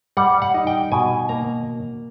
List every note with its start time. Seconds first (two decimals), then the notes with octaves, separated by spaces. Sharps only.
0.17 G3 F#5
0.42 F#5
0.54 D#4
0.67 G5
0.92 B2 G#5
1.29 A#3 A#5